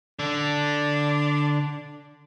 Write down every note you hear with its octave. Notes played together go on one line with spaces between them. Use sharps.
D3 D4